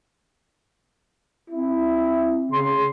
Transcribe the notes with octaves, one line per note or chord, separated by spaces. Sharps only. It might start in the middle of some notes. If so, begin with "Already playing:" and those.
C4 E4
C#3 C6